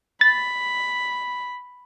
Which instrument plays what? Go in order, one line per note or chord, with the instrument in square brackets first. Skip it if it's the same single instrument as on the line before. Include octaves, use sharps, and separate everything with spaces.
[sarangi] B5 [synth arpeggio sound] A6